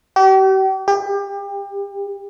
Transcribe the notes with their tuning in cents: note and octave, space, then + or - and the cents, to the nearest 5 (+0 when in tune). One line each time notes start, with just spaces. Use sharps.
G4 -40
G4 +30